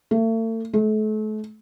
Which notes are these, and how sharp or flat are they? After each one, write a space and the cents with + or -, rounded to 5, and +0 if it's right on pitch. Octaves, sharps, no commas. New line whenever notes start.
A3 +40
A3 -35